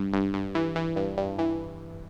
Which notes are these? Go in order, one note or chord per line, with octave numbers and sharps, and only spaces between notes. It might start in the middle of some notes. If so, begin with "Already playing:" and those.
Already playing: G2
G2
G2
E3
E3
G2
G2
E3